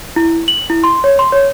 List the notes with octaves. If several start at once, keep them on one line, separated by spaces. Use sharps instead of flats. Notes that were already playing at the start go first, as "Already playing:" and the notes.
E4
F#7
E4
C6
C#5
C6
C#5